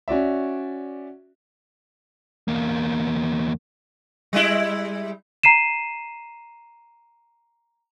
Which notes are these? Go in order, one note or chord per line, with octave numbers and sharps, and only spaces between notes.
C#4 F#4 D5 E5
E2 A#3
G3 G#3 E4
A#5 C7 D#7 E7